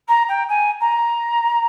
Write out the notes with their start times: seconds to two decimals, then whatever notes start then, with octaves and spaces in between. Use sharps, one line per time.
0.08 A#5
0.28 G5
0.49 G#5
0.80 A#5